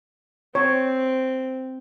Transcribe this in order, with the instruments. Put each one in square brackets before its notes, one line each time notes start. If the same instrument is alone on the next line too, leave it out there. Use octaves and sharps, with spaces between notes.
[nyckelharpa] C4 [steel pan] C#5